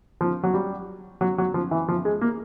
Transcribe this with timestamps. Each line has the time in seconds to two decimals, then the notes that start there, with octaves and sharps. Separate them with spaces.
0.21 F3
0.43 F#3
0.54 G3
1.21 F#3
1.38 F#3
1.54 F3
1.71 E3
1.88 F3
2.05 G#3
2.21 A#3